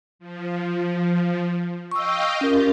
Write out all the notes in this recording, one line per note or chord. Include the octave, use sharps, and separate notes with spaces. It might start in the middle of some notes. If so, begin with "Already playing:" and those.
F3
D#5 F5 G5 C#6 E6
C#4 F4 G4 A#4